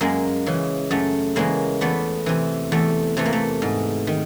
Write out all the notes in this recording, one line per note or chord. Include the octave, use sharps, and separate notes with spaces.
F#2 G#3 A#3
C#3 E3
F#2 A3
C#3 E3 G#3 A#3
E2 A3 B3
C3 E3
E2 A3
C3 E3 A3
A#3
A3
G#2
D#3